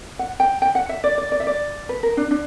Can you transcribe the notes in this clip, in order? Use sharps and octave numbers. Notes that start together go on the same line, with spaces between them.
F#5
G5
G5
F#5
E5
D5
D5
D5
E5
D5
B4
A#4
D4
D4